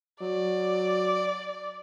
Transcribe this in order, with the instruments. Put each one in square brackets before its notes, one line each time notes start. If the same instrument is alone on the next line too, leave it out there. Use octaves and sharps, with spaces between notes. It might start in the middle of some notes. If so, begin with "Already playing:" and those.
[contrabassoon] F#3 [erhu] D5